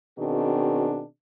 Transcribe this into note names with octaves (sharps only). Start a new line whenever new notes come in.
B2 D#3 C4 D4 F#4 G#4